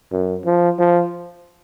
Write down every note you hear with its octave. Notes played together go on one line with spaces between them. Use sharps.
F#2
F3
F3